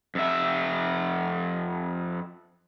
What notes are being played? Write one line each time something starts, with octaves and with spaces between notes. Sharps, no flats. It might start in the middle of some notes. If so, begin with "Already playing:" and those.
F2 E5